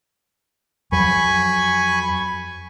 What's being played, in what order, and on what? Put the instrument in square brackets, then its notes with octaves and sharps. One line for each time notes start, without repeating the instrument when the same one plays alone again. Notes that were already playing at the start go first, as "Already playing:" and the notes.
[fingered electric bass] F2 F#3 [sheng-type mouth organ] G#5 B5 C#6